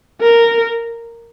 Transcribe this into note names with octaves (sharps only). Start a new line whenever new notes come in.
A#4